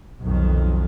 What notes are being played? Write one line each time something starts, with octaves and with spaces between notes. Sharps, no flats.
B1 F2 D#3